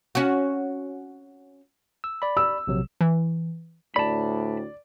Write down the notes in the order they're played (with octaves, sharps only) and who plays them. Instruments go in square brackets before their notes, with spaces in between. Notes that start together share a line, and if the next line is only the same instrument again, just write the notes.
[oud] C#4 F#4
[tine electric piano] E6
D5 B5
[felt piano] E6
[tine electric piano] A#1 C3 F#3
[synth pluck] E3
[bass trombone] D2 [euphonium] A2 [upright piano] D5 [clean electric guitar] A5 B5